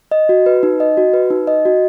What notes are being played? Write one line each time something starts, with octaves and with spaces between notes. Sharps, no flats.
D#5
F#4
B4
D#4
D#5
F#4
B4
D#4
D#5
F#4